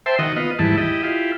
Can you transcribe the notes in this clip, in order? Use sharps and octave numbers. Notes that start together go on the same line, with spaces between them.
C5 E5 G5 A5
D#3 F#4 D#5
B3 F4 D#5
D#2 G#2 E3 G3 E4 A5
E4 G4 D#5
E4 F4 G4